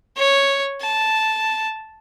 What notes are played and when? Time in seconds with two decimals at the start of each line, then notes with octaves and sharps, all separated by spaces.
0.17 C#5
0.81 A5